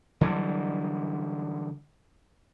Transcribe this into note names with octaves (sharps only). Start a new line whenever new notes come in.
D3 E3 F#3 G3